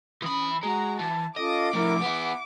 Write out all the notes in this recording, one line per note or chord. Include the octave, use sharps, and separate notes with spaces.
E3 C#4 B5 D#6
G#3 F#4 A#5
E3 A5
C#4 F4 A4 D#5 D6
A2 F3 E4 A#4
B3 E4 F#5